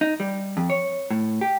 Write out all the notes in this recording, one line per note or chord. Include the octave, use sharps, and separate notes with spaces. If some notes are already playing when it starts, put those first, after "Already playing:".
D#4
G3
F2
C#5
A2
G4